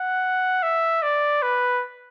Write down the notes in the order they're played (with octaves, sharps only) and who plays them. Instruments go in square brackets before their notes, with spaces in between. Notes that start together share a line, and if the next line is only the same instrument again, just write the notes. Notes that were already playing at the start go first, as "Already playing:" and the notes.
Already playing: [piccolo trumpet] F#5
E5
D5
B4